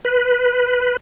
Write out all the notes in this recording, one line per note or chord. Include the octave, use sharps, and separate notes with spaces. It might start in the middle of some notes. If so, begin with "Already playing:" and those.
B4